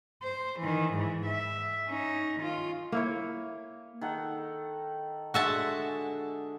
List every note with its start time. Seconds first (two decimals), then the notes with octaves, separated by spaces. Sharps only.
0.23 C5
0.60 D#3 E3
0.94 G#2 E3
1.26 E5
1.89 C#4 D#4
2.40 D#3 F4
2.92 A#3 E4 C#5
4.01 D#3 A4 F#5
5.34 D3 G#3 F#4 E5 A5